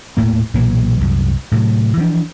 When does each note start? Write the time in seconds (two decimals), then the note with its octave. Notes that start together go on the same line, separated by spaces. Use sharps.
0.17 D#1 A2 A#3
0.54 B1 A#2 E3 F#3
1.01 C2 F#2
1.52 A2 C3 F3 F#3
1.97 E3 F3 A#3 D4